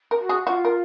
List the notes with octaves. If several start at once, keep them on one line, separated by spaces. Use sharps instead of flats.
A#4
F#4
G#4
F4 F#4
A#4